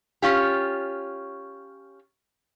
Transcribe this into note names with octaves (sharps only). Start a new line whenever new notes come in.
C#4 F4 G4